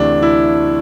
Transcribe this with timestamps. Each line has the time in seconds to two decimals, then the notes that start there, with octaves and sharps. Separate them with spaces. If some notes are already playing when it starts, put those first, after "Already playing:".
Already playing: D2 C3 E3 A3 D4
0.22 E4